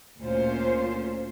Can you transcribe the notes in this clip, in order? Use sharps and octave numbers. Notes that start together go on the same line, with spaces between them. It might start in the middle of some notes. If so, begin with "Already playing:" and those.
D2 A#2 C#4 F4 C5